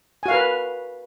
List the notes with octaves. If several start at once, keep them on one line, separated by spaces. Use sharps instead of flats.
F#4 A#4 B4 F5 G#5